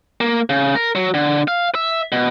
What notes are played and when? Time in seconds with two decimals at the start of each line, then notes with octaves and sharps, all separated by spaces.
0.21 A#3
0.50 C#3
0.75 A#4
0.95 F#3
1.14 D3
1.48 F5
1.75 E5
2.12 B2